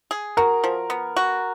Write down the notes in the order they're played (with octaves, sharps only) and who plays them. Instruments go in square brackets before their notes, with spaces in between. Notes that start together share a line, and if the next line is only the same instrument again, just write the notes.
[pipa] G#4
[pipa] F#4 [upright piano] A#4
[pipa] F3
B3
F#4